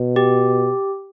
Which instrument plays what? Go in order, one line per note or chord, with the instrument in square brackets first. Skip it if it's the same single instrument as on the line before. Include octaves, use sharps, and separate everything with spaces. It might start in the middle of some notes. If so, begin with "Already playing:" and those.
Already playing: [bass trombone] B2
[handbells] G4